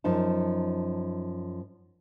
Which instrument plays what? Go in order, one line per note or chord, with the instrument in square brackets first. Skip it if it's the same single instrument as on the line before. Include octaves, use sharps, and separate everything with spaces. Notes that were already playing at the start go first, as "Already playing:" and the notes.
[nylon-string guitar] F#2 F3 D#4 A5